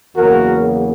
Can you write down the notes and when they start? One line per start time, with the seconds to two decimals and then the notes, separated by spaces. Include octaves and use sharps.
0.15 E2 C#3 F#3 A#3 F#4 A#4